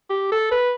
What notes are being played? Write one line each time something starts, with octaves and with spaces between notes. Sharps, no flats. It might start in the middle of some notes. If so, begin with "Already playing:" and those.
G4
A4
B4